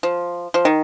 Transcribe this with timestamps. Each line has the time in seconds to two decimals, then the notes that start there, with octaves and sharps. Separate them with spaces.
0.03 F3
0.54 F3
0.65 D#3